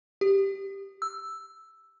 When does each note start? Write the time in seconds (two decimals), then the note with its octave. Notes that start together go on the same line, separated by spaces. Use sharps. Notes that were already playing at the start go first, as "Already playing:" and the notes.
0.21 G4
1.02 E6